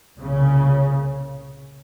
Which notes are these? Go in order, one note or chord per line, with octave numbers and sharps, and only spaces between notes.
C2 A#2 C#3